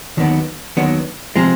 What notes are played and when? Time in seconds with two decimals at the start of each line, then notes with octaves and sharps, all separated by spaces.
0.17 D#2 D#3 F#3 B3 D4
0.77 D#2 D#3 F#3 B3 D4
1.36 C3 F3 G#3